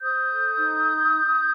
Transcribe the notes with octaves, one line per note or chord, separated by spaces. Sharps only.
C5 D#6 G6
A4
D#4